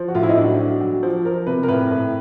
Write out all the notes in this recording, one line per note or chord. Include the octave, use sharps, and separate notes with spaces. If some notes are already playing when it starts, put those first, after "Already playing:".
Already playing: F3
F#4
A2 F4
E4
D#4
F#3 D4
F#3
F#3
F3
F3 A#4
C3 B4
A#4
A2 B4
A2